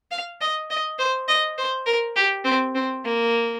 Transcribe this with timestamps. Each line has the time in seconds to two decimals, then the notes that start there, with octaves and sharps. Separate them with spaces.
0.11 F5
0.41 D#5
0.70 D#5
0.99 C5
1.28 D#5
1.58 C5
1.86 A#4
2.16 G4
2.45 C4
2.75 C4
3.04 A#3